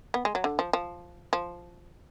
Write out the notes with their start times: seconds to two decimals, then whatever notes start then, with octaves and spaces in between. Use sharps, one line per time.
0.14 B3
0.25 G#3
0.35 F#3
0.44 D3
0.59 F3
0.73 F3
1.33 F3